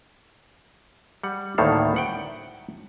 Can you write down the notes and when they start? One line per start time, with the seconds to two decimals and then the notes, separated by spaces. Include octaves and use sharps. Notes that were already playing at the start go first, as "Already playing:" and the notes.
1.23 G3 F#5
1.58 D2 A2 D#3 A#3 A4 F5
1.94 E5 F#5 G5